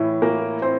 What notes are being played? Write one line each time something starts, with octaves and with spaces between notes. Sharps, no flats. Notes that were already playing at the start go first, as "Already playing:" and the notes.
Already playing: A2 E3 E4
A#3 A#4
C4 C5